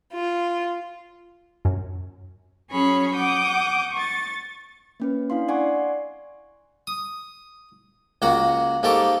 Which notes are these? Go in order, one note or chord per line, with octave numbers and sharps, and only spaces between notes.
F4
F#2
F#3 C#4 G#4 B5 C#6
F#5 D6 D#6 G6
C#6 A6
A#3 C#4 B4
D4 E4 F5 C6
D5 F#5 G#5 C6 C#6
D#6
C#2 A#3 F#4 F#5
G#2 A#3 G4 A4 C#6 D6